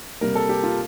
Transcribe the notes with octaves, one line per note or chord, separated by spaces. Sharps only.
C3 G3 A#3 A#4
A4
G4
F4